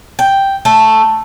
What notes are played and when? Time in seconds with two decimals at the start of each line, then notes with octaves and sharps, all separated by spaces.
0.19 G5
0.65 A3